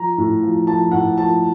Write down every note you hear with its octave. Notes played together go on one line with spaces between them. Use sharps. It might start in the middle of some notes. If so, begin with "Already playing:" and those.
Already playing: F3 A#5
A2
F3
F3 A5
A2 F#5
F3 A5